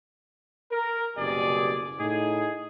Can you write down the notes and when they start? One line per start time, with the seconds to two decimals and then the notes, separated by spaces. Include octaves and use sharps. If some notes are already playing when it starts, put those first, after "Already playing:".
0.72 A#4
1.17 F#1 C2 B2 G4 G#4 D5
2.00 A2 D#4 G#4